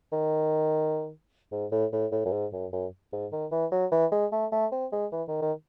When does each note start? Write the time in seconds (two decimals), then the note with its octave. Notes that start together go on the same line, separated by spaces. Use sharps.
0.12 D#3
1.52 G#2
1.72 A2
1.92 A2
2.12 A2
2.25 F#2
2.32 G#2
2.52 F#2
2.72 F#2
3.12 G#2
3.32 D#3
3.51 E3
3.72 F#3
3.91 E3
4.12 G#3
4.32 A3
4.52 A3
4.72 C4
4.92 G#3
5.12 E3
5.28 D#3
5.42 D#3